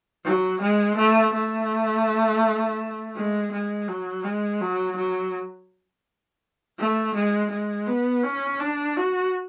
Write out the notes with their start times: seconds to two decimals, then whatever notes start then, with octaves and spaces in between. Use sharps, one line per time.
0.25 F#3
0.61 G#3
0.97 A3
1.34 A3
3.16 G#3
3.52 G#3
3.88 F#3
4.24 G#3
4.61 F#3
4.96 F#3
6.79 A3
7.15 G#3
7.51 G#3
7.87 B3
8.23 C#4
8.60 D4
8.97 F#4